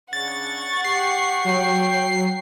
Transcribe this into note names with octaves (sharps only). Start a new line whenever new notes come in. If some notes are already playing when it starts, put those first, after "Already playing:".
C#3 D4 F#5 C#6 A6
G4 C7
F#3 G5